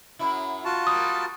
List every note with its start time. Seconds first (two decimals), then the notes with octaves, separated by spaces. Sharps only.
0.19 F#2 F#3 E4
0.65 F4 F#4 A5
0.87 G3 A#3 D#6